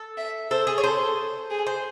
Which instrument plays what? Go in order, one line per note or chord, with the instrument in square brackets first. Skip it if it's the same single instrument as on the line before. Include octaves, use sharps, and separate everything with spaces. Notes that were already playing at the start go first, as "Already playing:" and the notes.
Already playing: [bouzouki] A4
[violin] E5
[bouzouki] A4 [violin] C5
[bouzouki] G#4
C#5
[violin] A4 [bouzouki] C5
[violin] G#4
[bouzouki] C5